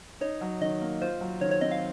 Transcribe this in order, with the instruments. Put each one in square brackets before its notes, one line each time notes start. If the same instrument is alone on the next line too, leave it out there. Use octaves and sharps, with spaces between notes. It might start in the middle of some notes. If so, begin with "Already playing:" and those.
[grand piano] D#4 [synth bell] C#5
[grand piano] F#3
[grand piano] D#3 [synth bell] D#5
[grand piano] A#3
[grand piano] F4 [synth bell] C5
[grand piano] F#3
[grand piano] D#3 [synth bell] C#5
[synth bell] C#5
[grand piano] C4 [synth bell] D#5
[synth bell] F5